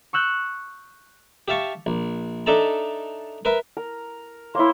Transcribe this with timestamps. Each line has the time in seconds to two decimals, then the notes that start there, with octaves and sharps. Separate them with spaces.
0.13 C#6 E6 F#6 G6
1.48 G4 E5 F5 A5 C#6
1.86 A#1
2.46 D4 D#4 A4 E5 A5 A#5
3.45 A#4 B4 E5
3.77 A#4
4.55 A#3 E4 C#5 C6